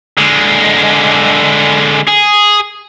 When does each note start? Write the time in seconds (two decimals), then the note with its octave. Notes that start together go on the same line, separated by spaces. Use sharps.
0.18 D3 G#3
2.08 G#4